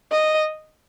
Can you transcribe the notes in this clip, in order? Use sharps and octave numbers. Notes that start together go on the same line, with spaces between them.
D#5